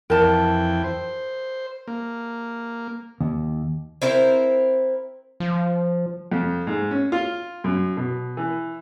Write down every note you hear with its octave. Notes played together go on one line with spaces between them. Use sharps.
F2 E3 A#4 G5 A5
C5
A#3
D#2
C4 E4 A#4 C5
F3
F2
G#2
C#4
F4
F#2
B2
E3